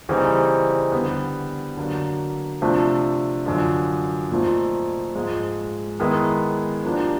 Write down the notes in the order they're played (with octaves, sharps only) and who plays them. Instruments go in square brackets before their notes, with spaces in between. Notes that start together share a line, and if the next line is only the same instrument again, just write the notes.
[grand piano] C#3 E3 G3 C4 D#4
D3 G3 B3
D3 F#3 A#3
C3 F3 A3 D4
F#2 D3 F3
A#2 F3 A3 C4 D#4
G#2 F3 G#3
D#3 G#3 B3 E4
F3 A#3 D4 G4